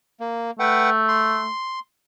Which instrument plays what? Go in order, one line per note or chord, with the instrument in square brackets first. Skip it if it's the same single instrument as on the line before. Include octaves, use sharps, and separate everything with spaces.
[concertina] A#3
[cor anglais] A3 [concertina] B4 F#5 G5
[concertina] C6